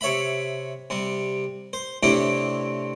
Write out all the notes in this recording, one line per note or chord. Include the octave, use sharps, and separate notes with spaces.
C3 C#5 E5 B5
C3 G3
C5
A2 C3 C4 D4 E4 G4